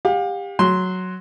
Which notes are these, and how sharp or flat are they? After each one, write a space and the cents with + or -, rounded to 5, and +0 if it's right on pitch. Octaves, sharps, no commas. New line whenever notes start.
G4 +25 F5 +40
F#3 +0 C6 +0